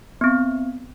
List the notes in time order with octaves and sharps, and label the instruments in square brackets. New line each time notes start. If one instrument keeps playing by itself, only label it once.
[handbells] B3 C4